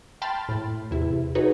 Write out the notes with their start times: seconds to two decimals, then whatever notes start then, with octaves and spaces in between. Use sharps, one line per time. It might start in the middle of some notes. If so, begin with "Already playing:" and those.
0.22 G5 A5 B5 C6 F6 A6
0.49 A2
0.91 E2 C3 E4
1.35 D#4 F#4 G#4 B4 C#5